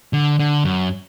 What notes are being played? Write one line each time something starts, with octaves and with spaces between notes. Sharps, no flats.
D3
D3
F#2